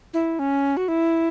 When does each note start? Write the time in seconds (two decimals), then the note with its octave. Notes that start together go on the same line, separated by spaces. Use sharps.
0.14 E4
0.39 C#4
0.77 F#4
0.88 E4